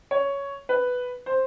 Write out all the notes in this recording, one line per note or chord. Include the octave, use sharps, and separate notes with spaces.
C#5
B4
C5